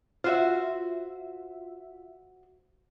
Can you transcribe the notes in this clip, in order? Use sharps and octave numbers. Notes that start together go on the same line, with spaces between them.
F4 F#4 C5 E5